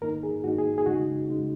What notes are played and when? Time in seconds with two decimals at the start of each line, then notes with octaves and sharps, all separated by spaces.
0.01 G#2 D#3 A#3 D#4 A#4
0.23 G#4
0.44 G#2 D#3 A#3 D#4 F#4
0.58 G#4
0.78 G#4
0.86 C#2 C#3 G#3 D#4 F#4
1.28 C#3 G#3 D#4